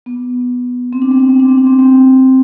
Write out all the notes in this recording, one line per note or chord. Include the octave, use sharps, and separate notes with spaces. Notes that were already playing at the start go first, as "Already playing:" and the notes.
B3
C4
D4
C4
D4
C4
D4
C4
D4
C4
C4